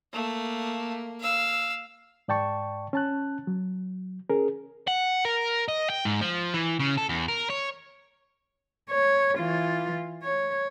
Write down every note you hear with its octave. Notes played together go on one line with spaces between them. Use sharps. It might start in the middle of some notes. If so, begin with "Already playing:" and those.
A3 A#3
F5 E6
G#2 D5 G5 A5 C#6
C#4 A5 F#6
F#3
C#4 G#4 A#4
F#5
A#4
D#5
G5
G#2
F3
E3
C#3
A4
E2
A#4
C#5
C#5
E3 F4
C#5